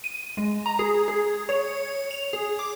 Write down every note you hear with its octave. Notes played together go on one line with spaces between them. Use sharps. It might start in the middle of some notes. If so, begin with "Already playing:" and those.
D#7
G#3
A#5
G#4
G#4
C#5
F7
G#4
D6